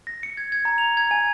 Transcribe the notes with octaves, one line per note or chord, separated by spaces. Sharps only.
A#6
C#7
G#6
G#6
A#5
F7
G#6
G#5